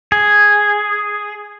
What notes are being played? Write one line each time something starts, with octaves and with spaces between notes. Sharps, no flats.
G#4